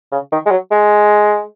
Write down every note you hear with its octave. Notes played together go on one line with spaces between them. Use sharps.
C#3
D#3
G#3
F#3
G#3